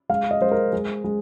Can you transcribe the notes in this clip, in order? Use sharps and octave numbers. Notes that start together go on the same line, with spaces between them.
G#3 F5
D#5
G#3 C5
A#4
G#3
G#3